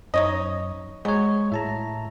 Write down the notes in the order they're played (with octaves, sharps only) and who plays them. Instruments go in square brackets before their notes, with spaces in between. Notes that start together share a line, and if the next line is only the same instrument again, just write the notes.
[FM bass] F#2 [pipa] D#4 C#5 D#5
[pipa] F#3 [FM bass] G#3 [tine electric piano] G#4 C#5
[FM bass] A2 [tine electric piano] E5 A5 A#5